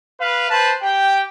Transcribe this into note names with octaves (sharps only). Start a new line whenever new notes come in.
B4 F5
B4 C5 A5
G4 G5